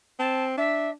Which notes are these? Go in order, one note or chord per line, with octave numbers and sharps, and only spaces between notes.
C4 A5
D4 E5